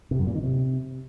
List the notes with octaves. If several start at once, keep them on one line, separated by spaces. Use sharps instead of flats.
C3
F#2
A#2
D#3
C3